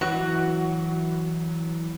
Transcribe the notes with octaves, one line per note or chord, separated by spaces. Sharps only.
E3 F#3 F#4